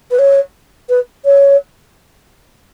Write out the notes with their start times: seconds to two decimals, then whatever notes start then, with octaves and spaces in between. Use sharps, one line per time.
0.11 B4
0.19 C#5
0.89 B4
1.25 C#5